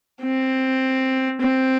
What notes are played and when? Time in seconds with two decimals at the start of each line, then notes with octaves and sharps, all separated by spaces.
0.22 C4
1.41 C4